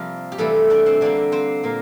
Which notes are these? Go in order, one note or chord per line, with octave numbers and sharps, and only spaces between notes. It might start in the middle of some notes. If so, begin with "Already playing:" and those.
Already playing: C3 F3 G3 A#3 F4
G4
C3 E3 G3 A3 A4
D4 D5
C4 C5
D3 G3 A#3 D4 D5
C4 C5
A#2 A#3 A#4